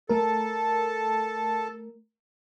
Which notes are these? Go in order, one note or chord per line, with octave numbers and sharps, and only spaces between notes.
A3 A4 A#4